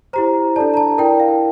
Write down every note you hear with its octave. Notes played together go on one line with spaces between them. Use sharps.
E4 G4 C5 A#5
D4 A4 D5 A5
A#5
A5
E4 A#4 D5 G5
F5